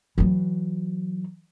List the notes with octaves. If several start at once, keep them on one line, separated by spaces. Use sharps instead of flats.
E3 F#3